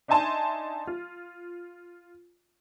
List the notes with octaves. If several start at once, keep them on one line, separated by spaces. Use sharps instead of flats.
D4 D#4 E5 G#5 A5 C6
F4